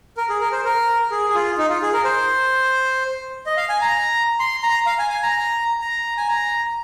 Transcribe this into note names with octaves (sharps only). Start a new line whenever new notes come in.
A#4
G#4
A#4
C5
A#4
G#4
G#4
F4
D#4
F4
G#4
A#4
C5
D#5
F5
G#5
A#5
C6
A#5
F5
G#5
G#5
A#5
A#5
G#5
A#5